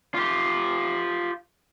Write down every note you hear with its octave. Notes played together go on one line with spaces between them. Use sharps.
F4 G4